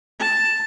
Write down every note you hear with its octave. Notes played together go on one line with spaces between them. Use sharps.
A5